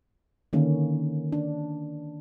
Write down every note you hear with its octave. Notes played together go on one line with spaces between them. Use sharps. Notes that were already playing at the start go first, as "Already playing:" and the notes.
D3 D#3 A#3 C#4
D4